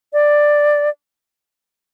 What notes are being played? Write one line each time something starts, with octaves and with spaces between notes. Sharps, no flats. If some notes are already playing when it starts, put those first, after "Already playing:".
D5